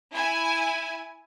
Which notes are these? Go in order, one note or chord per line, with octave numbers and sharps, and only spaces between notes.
E4 G#5